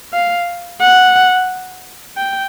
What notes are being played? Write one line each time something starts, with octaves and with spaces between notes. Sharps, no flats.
F5
F#5
G5